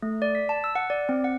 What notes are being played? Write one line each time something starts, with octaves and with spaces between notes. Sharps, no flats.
A3
D5
B6
A5
E6
F#5
D5
C4
F#5